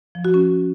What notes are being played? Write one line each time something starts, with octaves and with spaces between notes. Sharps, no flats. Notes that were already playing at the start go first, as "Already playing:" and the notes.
F3
F#4
C#4